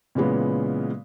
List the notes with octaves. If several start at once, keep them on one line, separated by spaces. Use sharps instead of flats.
A#2 C#3 E3 G#3 B3